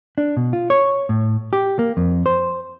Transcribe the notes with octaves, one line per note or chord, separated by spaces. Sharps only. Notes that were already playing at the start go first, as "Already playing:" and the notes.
D4
B2
F4
C#5
A2
G4
A#3
F2
C5